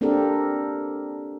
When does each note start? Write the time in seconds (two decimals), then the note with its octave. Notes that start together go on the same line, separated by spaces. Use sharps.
0.01 A#3 C4 D4 G4 A4 A#4